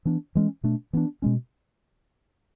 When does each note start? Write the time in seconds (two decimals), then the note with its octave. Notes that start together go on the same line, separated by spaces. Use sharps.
0.05 E3 B3 D4
0.35 E3 G#3 C#4
0.63 B2 A3 D4
0.93 E3 B3 D4
1.22 B2 G#3 C#4